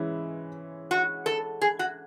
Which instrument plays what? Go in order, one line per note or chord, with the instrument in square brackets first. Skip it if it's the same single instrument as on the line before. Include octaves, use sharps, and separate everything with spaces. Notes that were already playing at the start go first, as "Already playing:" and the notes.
Already playing: [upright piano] E3 G#3 C#4 E4
[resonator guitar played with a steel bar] F#4
A4
G#4
F#4